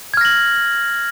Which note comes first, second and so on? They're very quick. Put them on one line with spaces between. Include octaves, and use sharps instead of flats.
G#6 F6 A#6 F#7